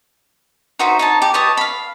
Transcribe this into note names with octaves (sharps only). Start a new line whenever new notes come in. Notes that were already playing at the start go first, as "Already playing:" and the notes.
D#4 F#4 C5 E5
D#4 C#5 A5
G4
B4 C#5 D#5 A5
F5 B5